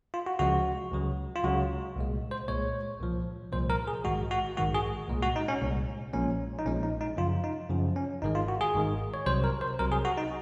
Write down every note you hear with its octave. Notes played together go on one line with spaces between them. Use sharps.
F4
F#4
C#2 C#3 F3 G#3 F#4
C#2 C#3 F#3
F4
C#2 C#3 F#3 F#4
C2 A#2 G#3
C5
C2 A#2 G#3 C#5
C2 A#2 F3
C2 A#2 F3 C5
A#4
G#4
A#1 G#2 D#3 G#3 F#4
F#4
A#1 G#2 D#3 G#3 F#4
G#4
C2 A#2 G#3
F#4
D#4
C#4
C2 A#2 G#3
A#1 A#2 F3 G#3 C#4
D#4
A#1 A#2 F3 G#3 C#4
D#4
D#4
F#2 C#3 F3 F4
D#4
F#2 C#3 F3
C#4
G#1 G#2 D#3 G#3 D#4
F4
F#4
G#4
G#1 G#2 D#3 G#3
C#5
C2 C3 F#3 C5
A#4
C5
C2 C3 F#3 A#4
G#4
F#4
D#4